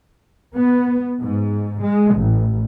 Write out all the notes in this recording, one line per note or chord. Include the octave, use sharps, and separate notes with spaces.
B3
G#2
G#3
A1